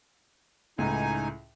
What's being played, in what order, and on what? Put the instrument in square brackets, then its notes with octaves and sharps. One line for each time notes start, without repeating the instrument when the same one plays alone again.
[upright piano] C#2 A2 [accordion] D#4 G#5